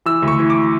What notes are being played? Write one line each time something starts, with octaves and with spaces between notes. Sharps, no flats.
E3 E6
D2
C#6
E3
D6